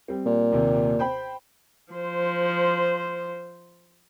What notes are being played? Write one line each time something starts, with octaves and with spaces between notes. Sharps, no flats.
G3 C4
A#2
D#2 C3
C5 G5 B5
F3 C5